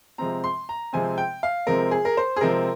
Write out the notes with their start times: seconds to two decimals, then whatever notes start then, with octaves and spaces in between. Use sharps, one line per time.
0.18 C3 F3 G#3 C4 A#5
0.44 C6
0.69 A#5
0.93 C3 F3 G#3 C4 G#5
1.18 G5
1.43 F5
1.67 C3 F3 G#3 C4 A#4
1.91 G#4
2.05 A#4
2.17 C5
2.36 G#4
2.41 C3 F3 G#3 C4 A#4